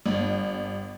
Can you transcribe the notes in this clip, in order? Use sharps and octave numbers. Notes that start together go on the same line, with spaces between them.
G1